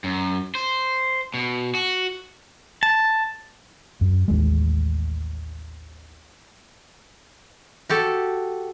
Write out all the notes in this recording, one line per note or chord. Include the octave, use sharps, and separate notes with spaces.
F#2
C5
B2
F#4
A5
F#2
A1 D#2 G#3
F#4 G4 A4